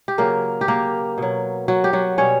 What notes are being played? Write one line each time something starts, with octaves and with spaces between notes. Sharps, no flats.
G4
C#3 F#3 A#3 A#4
G4
A#3 A#4
B2 F#3
F#3 F#4
G4
F#3 F#4
B2 G3 C#4 C#5